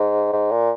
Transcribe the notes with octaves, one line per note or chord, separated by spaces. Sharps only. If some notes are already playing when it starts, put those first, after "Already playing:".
Already playing: G#2
G#2
A#2